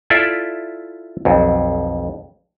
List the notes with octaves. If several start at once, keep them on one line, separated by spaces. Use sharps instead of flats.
E4 F4 A4 D5 E5
B1 F2